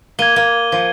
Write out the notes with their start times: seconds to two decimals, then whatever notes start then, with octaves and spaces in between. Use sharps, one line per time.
0.19 A#3 G#6 D#7 G7
0.36 A#3
0.72 F3